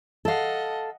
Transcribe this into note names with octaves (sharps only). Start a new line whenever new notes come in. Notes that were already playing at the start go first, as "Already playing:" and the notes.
A4 D#5 F5 F#5